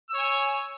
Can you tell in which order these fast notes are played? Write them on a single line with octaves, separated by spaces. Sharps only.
E6 C#5 G#5